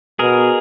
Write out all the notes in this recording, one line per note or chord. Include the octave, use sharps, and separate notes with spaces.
B2 G#4 A#4